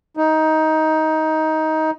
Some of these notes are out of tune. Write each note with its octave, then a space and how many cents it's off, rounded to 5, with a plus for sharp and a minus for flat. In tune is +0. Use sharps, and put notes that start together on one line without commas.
D#4 +15